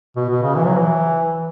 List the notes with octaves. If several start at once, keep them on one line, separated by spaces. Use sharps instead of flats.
B2
B2
C#3
E3
F#3
E3